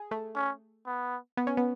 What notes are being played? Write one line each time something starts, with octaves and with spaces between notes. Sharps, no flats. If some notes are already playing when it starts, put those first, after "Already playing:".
Already playing: G#4
A3
C#4
B3
B3
C#4
B3